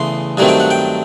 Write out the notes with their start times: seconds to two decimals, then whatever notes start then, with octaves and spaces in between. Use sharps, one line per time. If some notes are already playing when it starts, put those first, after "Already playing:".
Already playing: E2 C#3 E3 A3 C6
0.37 G2 D#3 F#3 A3 C4 G#5
0.48 G5
0.60 F#5
0.71 G5